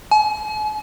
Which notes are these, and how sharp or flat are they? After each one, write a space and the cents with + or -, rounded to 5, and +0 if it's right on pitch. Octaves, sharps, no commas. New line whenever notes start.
G#5 +45